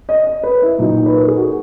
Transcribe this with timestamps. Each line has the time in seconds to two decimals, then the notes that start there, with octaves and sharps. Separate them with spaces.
0.09 D#5
0.27 D#5
0.43 B4
0.62 E4
0.78 A#2 F#3 D#4
1.06 B4
1.16 A#4
1.28 G#4
1.37 F#4